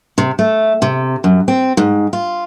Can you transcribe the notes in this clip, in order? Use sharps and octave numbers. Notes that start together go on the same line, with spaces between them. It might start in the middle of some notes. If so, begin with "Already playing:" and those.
C3
A3
C3
F#2
C4
G#2
F4